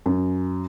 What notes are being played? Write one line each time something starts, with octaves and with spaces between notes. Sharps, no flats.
F#2